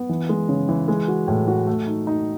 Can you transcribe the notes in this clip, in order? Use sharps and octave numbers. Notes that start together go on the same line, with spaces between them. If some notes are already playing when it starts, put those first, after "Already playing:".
Already playing: B3
E3
G#3
C#3
E3
G#3
F#4
A2
F#4
A3
D#4
D#4